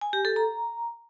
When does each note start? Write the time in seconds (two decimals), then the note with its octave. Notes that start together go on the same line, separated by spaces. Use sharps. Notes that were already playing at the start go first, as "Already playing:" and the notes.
0.01 G#5
0.13 G4
0.25 A4
0.36 A#5